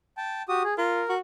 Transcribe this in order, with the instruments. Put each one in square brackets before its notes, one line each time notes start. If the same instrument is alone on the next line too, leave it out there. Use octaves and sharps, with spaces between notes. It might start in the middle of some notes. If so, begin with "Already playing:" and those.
[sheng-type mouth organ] G5 A5
F#4 G4 D#6
G#4
[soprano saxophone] F4 [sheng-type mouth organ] A#4
[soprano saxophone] F#4